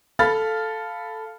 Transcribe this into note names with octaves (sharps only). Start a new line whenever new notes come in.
A4 F5 B5 F6 A6